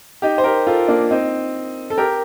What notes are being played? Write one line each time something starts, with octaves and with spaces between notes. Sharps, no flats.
D#4 G4
C5
G4 A#4
F4 A4
A#3 D4
C4 D#4
A4
G4 A#4